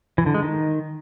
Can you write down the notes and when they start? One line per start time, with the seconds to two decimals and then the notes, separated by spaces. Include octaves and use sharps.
0.18 E3
0.26 D3
0.34 G#3
0.43 D#3